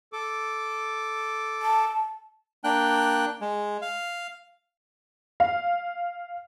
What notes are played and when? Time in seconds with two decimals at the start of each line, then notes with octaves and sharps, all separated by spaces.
0.13 A4 D6
1.62 A5
2.64 A#3 D4 G5 F#6
3.41 G#3
3.82 F5
5.40 F5